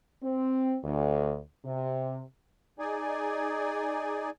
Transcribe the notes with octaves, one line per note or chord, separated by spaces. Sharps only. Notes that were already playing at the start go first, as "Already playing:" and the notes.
C4
D2
C3
D#4 G#4 D5 G#5